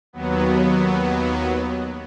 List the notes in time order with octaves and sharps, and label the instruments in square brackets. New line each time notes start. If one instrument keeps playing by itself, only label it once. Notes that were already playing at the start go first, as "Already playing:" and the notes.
[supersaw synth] D#2 F#3 B3